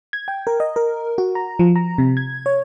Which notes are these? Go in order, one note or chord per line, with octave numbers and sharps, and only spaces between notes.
G#6
G5
A#4
D#5
A#4
F#4
A#5
F3
A#5
C3
G#6
C#5